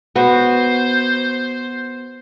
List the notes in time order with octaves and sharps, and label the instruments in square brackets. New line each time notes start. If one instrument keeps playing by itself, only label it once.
[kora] B3 F#4 [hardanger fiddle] C5